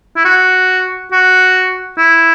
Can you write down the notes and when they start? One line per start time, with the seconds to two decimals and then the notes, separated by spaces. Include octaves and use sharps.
0.17 E4
0.25 F#4
1.12 F#4
1.98 E4